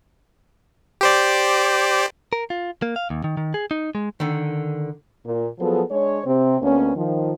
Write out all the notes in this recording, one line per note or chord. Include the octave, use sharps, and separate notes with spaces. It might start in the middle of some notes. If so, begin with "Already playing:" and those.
G4 C5 D5
A#4
F4
A#3
F5
D#2
D#3
D#3
G#4
D#4
G#3
D3 D#3
A#2
F3 F#3 B3 G#4 A4
G#3 D4 C#5
C3 C4
D2 A#3 B3 C#4
D#3 F3